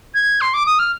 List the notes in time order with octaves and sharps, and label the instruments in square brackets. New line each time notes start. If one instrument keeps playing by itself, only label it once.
[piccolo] G#6
C6
D6
D#6
F6